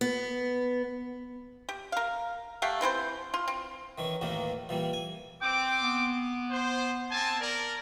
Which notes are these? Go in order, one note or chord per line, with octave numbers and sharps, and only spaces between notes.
B3
G4
A#4 F5
A3 G4 F5 F#5
E3 C4 E4 C5
F4
C4
D#3 E3 C#4
D#2 A2 D#3 E3 A#3
A#2 E3 G3
G#5
C4 G5 D6
B3
C5
C4 G#5 A5
A#4 D5